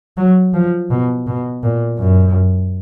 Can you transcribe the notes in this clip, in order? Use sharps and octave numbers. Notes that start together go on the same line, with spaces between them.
F#3
F3
B2
B2
A#2
F#2